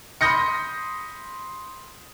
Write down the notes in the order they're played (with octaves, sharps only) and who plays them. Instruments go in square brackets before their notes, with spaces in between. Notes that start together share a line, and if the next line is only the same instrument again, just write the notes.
[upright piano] B5 C6 D#6 G6 A#6 C#7